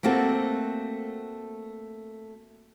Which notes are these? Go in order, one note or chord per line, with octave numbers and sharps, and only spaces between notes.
A3 A#3 C4 F#4 A4